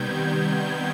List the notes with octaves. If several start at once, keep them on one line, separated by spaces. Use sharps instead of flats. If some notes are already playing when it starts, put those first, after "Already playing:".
Already playing: C3 D#3 G3 B3 G6 G#6